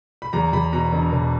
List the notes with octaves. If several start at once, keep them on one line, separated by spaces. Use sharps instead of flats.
B5
E2 A#5
E2 B5
B2 A#5
E1
E1